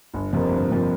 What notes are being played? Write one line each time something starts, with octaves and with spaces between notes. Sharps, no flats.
G1
F2 C3 F3 A#3
G1
F2 C3 F3 A#3